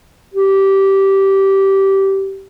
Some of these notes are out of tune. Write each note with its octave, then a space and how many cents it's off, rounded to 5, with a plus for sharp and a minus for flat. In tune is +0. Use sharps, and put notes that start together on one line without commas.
G4 -15